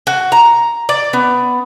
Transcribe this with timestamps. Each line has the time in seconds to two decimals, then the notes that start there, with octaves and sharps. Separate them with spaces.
0.07 F#4
0.32 A#5
0.89 D5
1.13 B3